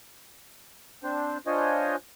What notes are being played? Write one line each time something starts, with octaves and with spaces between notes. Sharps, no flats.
C4 D4 C5
D4 F4 C5 C#5 D#5 G#5